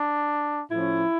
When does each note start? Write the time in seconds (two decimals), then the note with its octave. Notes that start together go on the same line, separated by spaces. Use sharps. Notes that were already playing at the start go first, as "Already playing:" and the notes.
Already playing: D4
0.70 A2 F3 C#4 E4